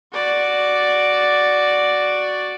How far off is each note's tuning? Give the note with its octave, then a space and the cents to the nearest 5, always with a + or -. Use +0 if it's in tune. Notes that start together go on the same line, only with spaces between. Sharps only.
F#4 +0 D5 +0